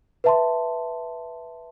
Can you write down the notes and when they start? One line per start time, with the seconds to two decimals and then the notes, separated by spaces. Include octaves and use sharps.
0.24 B4 E5 A5 C6